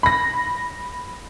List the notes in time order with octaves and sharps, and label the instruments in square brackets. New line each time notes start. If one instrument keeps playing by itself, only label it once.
[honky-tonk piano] B5 A#6